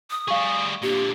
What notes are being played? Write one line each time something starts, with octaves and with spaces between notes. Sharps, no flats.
D#6
G3 G#4 F5 C#6
A#2 D3 G4